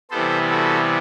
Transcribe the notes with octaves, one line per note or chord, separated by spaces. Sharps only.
C3 E3 G3 B3 A4 C5
F#4 A4